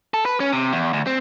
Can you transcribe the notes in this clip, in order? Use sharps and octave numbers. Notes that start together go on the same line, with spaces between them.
A4
B4
C#4
C3
E2
D2
C4